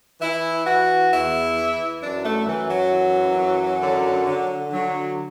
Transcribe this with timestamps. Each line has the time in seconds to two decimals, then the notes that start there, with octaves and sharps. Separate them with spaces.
0.21 E3 E4
0.66 E3 F#4
1.10 E2 E4
1.55 E3
2.01 F#2 D4
2.24 A3
2.46 F#2 E3
2.69 F#3
2.91 E3
3.37 F#2
3.81 D3
4.26 D3
4.72 D3 F#3